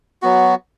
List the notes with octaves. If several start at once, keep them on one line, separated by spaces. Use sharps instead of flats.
F#3 B3 F#4